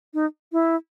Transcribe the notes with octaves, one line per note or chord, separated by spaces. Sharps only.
D#4
E4